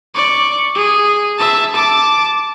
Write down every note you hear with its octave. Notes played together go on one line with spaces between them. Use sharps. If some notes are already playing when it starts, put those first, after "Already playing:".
D5 C#6
G#4
E5 A5
A5 D6